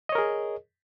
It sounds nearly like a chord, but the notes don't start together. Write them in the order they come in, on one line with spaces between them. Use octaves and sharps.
D#5 C#5 A#4 G#4